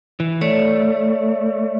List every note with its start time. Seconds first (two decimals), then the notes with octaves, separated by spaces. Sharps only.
0.20 E3
0.41 A3 C#5 D5